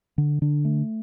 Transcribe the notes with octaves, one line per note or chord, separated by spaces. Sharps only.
D3
D3
A3